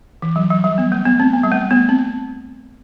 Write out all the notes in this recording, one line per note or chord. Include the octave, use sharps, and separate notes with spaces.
E3
F#3
F#3
G3
B3
A3
B3
C4
B3
G3
A3
B3
C4